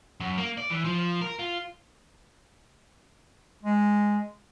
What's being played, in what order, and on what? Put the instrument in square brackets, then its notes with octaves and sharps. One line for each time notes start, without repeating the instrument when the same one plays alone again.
[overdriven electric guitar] F#2
A#3
D5
E3
F3
A#4
F4
[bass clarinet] G#3